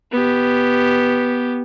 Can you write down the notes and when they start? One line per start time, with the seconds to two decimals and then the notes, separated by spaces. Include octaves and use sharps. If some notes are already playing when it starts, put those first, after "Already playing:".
0.12 B3 G4